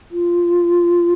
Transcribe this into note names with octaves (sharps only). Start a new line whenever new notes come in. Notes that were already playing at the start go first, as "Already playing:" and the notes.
F4